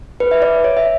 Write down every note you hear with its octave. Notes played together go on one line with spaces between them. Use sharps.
B4
E5
D5
C#5
E5